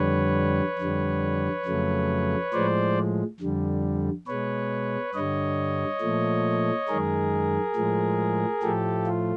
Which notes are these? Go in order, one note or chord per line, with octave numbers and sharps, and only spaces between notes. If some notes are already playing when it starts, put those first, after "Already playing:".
Already playing: F2 D3 G3 B4 C#5
F2 D3 G3
F2 C#3 F#3 A3
A2 F3 G#3 C5 D5
F2 D3 G3
B2 G#3 B4 C#5
G2 D3 G3 C#5 D#5
A#2 F3 A3
F#2 D#3 G#3 G#4 A#4
A2 F3 G#3
A2 F3 A3 G4 A4
F4